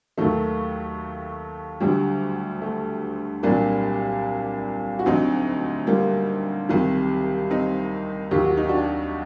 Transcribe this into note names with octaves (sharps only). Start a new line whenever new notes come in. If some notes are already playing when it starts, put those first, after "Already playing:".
D#2 D#3 F#3 A3
D2 D3 F#3 G3
A3
C2 A#2 F#3 A#3 D4
F#4
D2 D3 F#3 C4 D#4
G3 A#3
C2 C3 D#3 F#3
C4 D#4
D#2 D#3 F#3 G4
F#4
D#4
D4 F#4